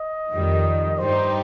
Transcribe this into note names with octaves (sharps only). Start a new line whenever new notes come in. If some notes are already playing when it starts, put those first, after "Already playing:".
Already playing: D#5
F2 D#3 G3
G2 G3 D#4 G4 C5